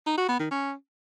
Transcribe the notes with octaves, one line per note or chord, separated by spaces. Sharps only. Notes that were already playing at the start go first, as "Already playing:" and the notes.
D#4
F#4
B3
D#3
C#4